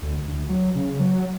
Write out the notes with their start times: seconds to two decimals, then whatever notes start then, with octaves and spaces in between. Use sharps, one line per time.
0.02 D2
0.28 D2
0.49 F#3
0.75 C#3
1.00 F#3